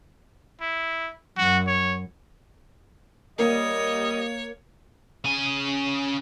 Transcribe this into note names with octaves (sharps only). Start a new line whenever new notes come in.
E4
F#2 F#4
C#5
G3 A#3 C#5 D#5
C#3 G#5